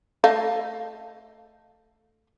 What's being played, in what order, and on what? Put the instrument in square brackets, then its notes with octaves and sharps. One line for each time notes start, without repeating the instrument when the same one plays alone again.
[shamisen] A3 D#5 F5